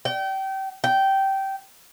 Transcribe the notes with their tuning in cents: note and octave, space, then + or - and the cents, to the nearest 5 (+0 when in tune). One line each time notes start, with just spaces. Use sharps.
G5 -30
G5 -15